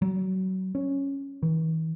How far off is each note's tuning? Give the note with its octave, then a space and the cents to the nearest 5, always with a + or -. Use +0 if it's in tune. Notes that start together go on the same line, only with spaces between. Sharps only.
F#3 +25
C#4 -5
E3 -45